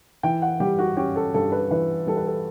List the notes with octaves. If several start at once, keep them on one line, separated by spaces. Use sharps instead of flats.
E3 G5
F#5
G3 G4
F#4
C#4 G4
A4
G2 A4
B4
E3 B4
G3 A4
B4
A4